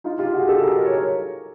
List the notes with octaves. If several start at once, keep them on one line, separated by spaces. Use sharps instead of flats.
D#4 F4
F4 G4
F#4 G#4
G4 A4
G#4 A#4
G#4 A#4
C#5